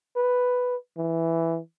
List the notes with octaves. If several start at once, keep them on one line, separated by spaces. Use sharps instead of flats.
B4
E3